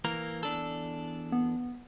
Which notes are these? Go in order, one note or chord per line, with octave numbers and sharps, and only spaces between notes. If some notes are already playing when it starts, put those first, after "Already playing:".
E3 A#3 A#4
E2 D4 A4
B3